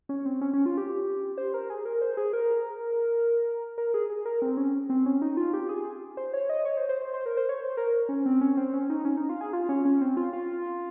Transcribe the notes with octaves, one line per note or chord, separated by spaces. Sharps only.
C#4
C4
C#4
C#4
F4
G4
C5
A#4
G#4
A#4
C5
G#4
A#4
A#4
G#4
G#4
A#4
C4
C#4
C4
C#4
D#4
F4
G4
G#4
C5
C#5
D#5
C#5
C5
C5
C5
C5
A#4
C5
C#5
C5
A#4
C#4
C4
C#4
C4
C#4
D#4
C#4
D#4
F4
G#4
F4
C#4
C#4
C4
F4
F4